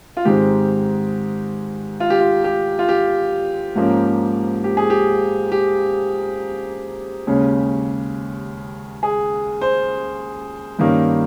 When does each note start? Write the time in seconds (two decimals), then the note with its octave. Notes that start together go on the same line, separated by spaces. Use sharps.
0.17 F4
0.25 G#2 D#3 G#3 C4 G4
2.00 F4
2.10 G4
2.20 F4
2.44 G4
2.79 F4
2.89 G4
3.75 G#2 F3 A#3 C#4
4.64 G4
4.77 G#4
4.90 G4
5.52 G4
7.27 D#2 C#3 G#3 C#4
9.03 G#4
9.61 C5
10.79 G2 D#3 A#3 C#4